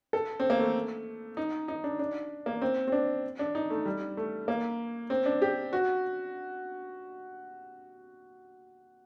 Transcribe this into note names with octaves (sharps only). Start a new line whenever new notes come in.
A4
C4
A#3
A3
D#4
D#4
D4
D4
A#3
C4
C4
D4
D4
D#4
A3
G3
A3
A#3
C4
D4
G4
F#4